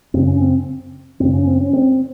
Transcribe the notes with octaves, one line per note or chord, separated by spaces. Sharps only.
F#2 C#3 C4
C#4
C4
F#2 C#3 C4
C#4
C4
C#4
C4